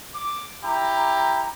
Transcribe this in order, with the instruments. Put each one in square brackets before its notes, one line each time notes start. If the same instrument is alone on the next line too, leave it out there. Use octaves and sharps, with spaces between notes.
[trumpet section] D6
[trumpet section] E4 G4 [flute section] A#5